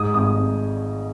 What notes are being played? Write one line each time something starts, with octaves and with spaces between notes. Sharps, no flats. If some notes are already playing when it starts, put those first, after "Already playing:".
Already playing: G#2 D#6
G#1 D#6
G#1